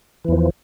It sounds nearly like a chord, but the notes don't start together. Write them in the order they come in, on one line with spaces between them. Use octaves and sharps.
E3 E2 F3